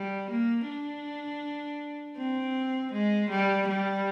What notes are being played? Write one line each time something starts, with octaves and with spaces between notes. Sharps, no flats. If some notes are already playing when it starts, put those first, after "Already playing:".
Already playing: G3
A#3
D4
C4
G#3
G3
G3